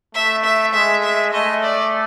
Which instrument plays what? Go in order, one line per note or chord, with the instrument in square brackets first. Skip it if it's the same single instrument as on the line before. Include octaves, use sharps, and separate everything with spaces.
[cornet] A3 [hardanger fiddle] E5
[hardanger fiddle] E5
[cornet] G#3 [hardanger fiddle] E5
[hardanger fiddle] E5
[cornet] A3 [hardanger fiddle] D#5
[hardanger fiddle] D5